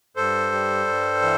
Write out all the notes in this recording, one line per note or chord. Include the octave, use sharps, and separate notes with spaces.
G2 A4 C5
G3
G2
E3